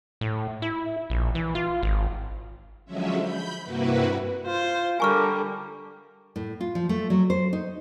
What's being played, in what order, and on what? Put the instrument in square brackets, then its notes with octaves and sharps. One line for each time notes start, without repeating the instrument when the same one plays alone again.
[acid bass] A2
E4
A#1
E3
F4
G#1
[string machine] D3 F3 F#3 G#3 C#4 E5
B5 G6
G2 C3 A#3 E4 F#4 B4
[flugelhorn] F4 [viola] C5
[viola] D3 G3 [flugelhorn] A#4 [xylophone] G#5 C#6 F6
[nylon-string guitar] A2
F4
F3
A3
F#3
C5
D#4